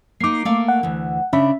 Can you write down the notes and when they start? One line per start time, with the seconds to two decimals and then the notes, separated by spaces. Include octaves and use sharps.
0.20 A#3 D#4 D6 C7
0.45 A3 A#3 F5
0.68 F#5
0.83 D2 E3
1.33 C#3 C#4 D4 E5 B5